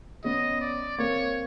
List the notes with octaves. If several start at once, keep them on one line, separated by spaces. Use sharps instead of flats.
B3 C#4 D#5
D5
A#3 C4 C#5